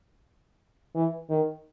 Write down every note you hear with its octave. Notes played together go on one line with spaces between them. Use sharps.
E3
D#3